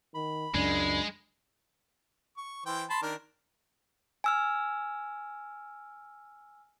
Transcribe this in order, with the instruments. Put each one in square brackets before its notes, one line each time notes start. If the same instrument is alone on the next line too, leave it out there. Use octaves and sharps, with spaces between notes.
[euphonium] D#3 [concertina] B5
[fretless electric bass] C#2 F#2 C#3 [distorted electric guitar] G#3 [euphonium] D4
[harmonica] C#6
E3 C5 G5
A5 B5 C6
D#3 D4 A#4
[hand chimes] G#5 E6 F6